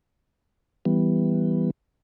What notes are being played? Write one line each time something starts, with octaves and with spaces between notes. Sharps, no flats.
E3 G3 B3